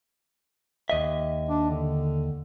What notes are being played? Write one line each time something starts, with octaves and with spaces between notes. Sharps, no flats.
D#2 D#5 E5
D4
D3